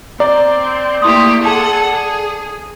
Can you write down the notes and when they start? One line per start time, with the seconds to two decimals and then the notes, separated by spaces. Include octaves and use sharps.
0.20 C4 D5 A#5
1.02 A3 A#3 E4 G4 C6 D#6
1.44 G#4 A4 F#5 A5 D#6
1.93 G#4